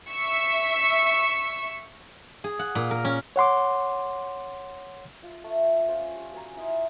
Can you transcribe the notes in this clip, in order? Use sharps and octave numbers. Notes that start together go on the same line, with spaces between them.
E5 C#6 E6
G#4
F#5
A#2
A#4
C#4
C#5 F#5 C6 D6
F4
A3
C#4 F4 C5 C#5
G3
F#4 G#5 A#5
E4 D#5 F5 C6